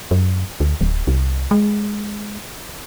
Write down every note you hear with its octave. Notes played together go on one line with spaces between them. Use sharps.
F#2
D2
D1
C2
G#3